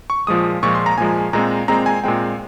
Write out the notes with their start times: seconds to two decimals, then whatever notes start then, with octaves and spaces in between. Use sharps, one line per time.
0.10 C#6
0.27 A#2 F3 G#3 D#6
0.63 A#2 F3 G#3 C#6
0.75 C6
0.86 A#5
0.98 A#2 F3 G#3 G#5
1.33 A#2 G#3 C4 A#5
1.68 A#2 G#3 C4 A#5
1.86 G#5
2.04 A#2 G#3 C4 G5